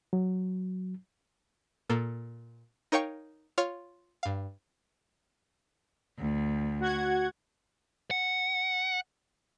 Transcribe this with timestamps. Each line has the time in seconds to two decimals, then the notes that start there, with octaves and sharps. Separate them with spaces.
0.13 F#3
1.90 A#2 A#3 A4
2.92 D#4 A#4 C#5 F5 G5 C#6
3.58 F4 C#5 F5
4.23 G2 F5
6.17 D2
6.80 F#4 F#5 G#6
8.11 F#5